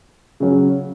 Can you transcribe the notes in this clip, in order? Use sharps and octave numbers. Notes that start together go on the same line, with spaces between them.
C#3 F#3 C#4